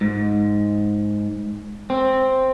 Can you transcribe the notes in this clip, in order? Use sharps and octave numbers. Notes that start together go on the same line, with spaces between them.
G#2
C4